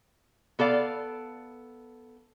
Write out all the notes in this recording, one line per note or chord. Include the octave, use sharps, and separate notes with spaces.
B3 A4 D5 F5